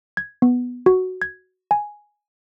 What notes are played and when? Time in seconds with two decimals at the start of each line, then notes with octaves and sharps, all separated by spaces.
0.17 G#6
0.42 B3
0.86 F#4
1.22 G#6
1.71 G#5